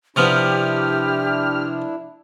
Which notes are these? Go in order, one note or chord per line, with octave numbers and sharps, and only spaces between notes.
C3 F3 B3 D4 E4 G4 F6